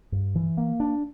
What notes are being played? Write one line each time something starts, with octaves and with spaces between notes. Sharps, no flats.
G2
E3
A#3
D4